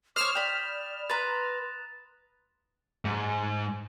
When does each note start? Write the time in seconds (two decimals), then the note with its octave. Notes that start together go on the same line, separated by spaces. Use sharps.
0.16 C5 C#5 D6 D#6 F6 E7
0.35 D5 G5 B5 F7
1.10 B4 A#5 C6 F#6 A6
3.05 G#2